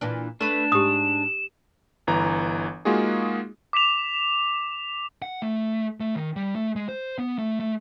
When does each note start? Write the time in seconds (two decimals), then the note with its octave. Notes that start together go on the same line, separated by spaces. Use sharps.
0.01 A#2 E3 D4
0.41 A3 D4 B4 E7
0.72 G#2 G4 D#6
2.07 G1 E3 A#5
2.85 G#3 A#3 D#4 F4 F#4 G#4
3.73 D6 B6 E7 F7
5.22 F#5
5.42 A3
6.00 A3
6.15 D#3
6.36 G3
6.55 A3
6.76 G#3
6.89 C5
7.18 B3
7.38 A3
7.60 A3